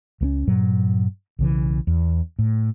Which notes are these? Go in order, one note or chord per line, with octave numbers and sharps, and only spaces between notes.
C#2 A3 C#4
G2 A#2 F#3
B1 C#3 E3
E2
A2